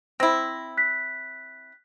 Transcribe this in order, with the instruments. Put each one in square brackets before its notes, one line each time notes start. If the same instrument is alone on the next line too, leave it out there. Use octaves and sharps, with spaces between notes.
[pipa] C4 E4 [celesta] A#6
[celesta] F#6 B6